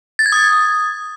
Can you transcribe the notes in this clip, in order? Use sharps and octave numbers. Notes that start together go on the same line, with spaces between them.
A6
G#6
D#6